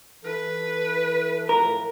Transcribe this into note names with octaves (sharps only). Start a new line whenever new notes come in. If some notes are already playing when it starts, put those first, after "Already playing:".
E3 A4 B4
A2 F3 A4 A#4